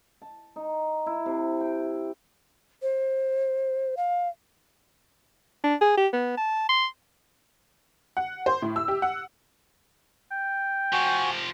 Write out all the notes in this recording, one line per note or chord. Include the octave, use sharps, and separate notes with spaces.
A5
D#4
E4
C3
G5
C5
F5
D4
G#4
G4
B3
A5
C6
F#5
C5
A2
E6
G4
F#5
G5
F3 F#4 G4 G#5